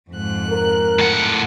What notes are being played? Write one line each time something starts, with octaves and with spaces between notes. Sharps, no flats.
F2 G#2 F#6
A#4
A2 F#5